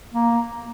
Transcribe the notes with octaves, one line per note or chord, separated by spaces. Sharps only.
A#3